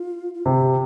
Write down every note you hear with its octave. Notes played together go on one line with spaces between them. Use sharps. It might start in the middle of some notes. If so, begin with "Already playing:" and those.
Already playing: F4
F4
C3 G4